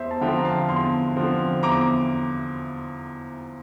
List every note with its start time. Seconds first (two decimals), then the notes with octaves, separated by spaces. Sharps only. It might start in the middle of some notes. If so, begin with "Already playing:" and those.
Already playing: E2 C5 E5
0.11 A5
0.21 D3 F3 C4 E5 G5
0.36 A#5
0.45 F5 A5
0.68 E2 A5 C6
1.16 D3 F3 C4
1.63 E2 A#5 D6